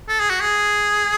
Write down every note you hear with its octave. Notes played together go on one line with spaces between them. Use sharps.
A4
G#4
F#4
G#4